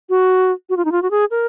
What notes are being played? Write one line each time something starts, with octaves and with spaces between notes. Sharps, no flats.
F#4
F#4
F4
D#4
F4
F#4
G#4
A#4